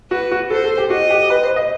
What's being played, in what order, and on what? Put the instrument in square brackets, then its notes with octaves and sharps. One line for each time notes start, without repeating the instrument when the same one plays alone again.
[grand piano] F#4 [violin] B4
[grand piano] F#4
[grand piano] A4 [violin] C5
[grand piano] A4
G4
[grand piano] F#4 [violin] D#5
[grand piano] G4
B4
C5
D#5